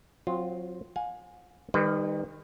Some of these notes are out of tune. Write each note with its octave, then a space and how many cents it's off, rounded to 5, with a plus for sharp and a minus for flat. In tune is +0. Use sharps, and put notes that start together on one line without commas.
F#3 -25 C4 +0 F4 +0
F5 +45 G#5 +0
D#3 -10 G3 +35 B4 +30